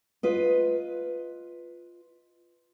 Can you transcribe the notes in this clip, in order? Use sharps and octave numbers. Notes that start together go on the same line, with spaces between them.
F4 B4 D#5